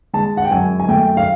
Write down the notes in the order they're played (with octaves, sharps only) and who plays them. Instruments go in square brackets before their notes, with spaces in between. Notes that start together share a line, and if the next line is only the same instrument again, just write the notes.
[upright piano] G#3 A5
F#5
G5
F#2 G#5
G#5
A3 G5
F5